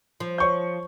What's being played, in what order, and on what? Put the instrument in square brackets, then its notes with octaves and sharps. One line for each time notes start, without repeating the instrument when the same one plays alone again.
[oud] F3
[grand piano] C#5 C#6 G6